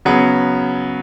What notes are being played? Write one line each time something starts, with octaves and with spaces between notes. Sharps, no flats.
C#3 F#3 B3